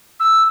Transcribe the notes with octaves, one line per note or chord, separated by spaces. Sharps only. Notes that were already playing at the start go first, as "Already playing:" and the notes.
E6